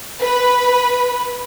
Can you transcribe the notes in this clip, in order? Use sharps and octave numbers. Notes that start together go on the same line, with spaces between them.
B4 B5